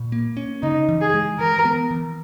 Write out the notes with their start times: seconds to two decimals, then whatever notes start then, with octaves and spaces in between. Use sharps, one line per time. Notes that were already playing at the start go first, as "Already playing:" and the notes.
Already playing: A#2
0.12 A#3
0.37 C#4
0.62 C#3 D#4
0.89 E3
1.01 G#4
1.14 G#3
1.39 E3 A#4
1.65 B3
1.91 E3